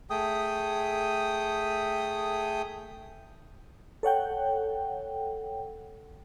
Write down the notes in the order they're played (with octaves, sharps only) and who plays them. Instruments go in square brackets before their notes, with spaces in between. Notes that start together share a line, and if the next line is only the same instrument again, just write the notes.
[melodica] A3 G#4 G5 D#6
[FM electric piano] A4 C#5 F#5 G5